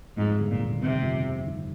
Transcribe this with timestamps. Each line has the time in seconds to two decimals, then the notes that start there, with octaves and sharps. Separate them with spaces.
0.17 F2 G#2
0.39 G1
0.50 A#2
0.60 D#3
0.81 G1 C3
1.02 F2
1.24 G1
1.46 D#3